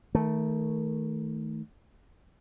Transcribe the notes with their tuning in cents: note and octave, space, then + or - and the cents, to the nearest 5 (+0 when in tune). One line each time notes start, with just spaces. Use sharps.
D#3 +20 A3 +0